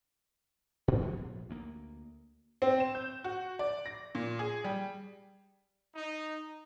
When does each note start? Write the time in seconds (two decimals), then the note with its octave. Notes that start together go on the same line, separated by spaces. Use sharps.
0.88 A#2 C4
1.01 D2 F3 A3 B3
1.17 A#1
1.50 D2 A#3
2.62 C4
2.80 E7
2.95 G6
3.24 F#4
3.59 D5
3.86 A#6
4.15 A#2
4.39 G#4
4.64 G3
5.95 D#4